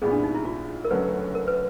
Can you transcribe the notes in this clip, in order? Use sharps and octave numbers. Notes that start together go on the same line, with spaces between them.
C2 A#2 G3 B3 E4 G#4
D4
D#4
E4
F4
A#4
F#1 F#2 D3 F#3 A3 B4
A#4
B4